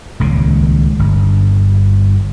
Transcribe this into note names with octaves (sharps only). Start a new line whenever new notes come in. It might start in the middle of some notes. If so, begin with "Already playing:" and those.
D#1 C#2 C#3
G1